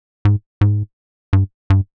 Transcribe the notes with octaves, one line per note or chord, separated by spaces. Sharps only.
G#2
G#2
G2
G2